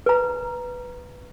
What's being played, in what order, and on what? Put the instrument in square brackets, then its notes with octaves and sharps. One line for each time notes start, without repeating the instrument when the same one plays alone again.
[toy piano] B4 A#5